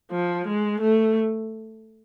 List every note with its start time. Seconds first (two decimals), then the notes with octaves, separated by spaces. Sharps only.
0.11 F3
0.47 G#3
0.80 A3